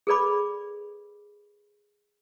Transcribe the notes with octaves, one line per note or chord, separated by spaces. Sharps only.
G#4 A4 B4 D5 B5 D6